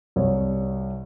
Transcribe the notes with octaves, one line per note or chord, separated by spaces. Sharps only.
C2 C#5